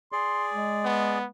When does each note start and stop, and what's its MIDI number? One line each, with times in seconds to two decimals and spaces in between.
0.12 1.18 68
0.12 1.18 74
0.12 0.47 84
0.54 1.29 56
0.85 1.26 59